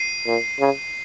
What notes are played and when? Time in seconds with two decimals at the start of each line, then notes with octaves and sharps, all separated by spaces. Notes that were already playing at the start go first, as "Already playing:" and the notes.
Already playing: C7 D#7
0.27 A#2
0.60 C#3